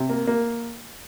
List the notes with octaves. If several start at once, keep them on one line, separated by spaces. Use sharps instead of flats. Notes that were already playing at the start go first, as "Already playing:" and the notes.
Already playing: C3
A#3
A#3